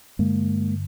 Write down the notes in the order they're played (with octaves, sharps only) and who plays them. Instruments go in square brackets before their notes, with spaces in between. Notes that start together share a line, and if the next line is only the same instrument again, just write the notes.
[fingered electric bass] G2 D3 G#3 A#3